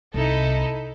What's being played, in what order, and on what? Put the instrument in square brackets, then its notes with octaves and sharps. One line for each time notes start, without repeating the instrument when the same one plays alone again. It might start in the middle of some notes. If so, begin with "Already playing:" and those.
[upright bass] C2 [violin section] D#4 E4 A4